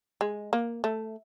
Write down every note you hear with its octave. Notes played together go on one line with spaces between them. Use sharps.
G#3
A#3
A3